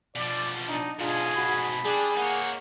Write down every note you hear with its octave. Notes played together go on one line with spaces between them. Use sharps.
B2 F3 D5
D4 D#4
G#2 B2 D4 F4 G#4
F#4 B5
G3 D4 G#4
A#3 D#4 C#5 F#5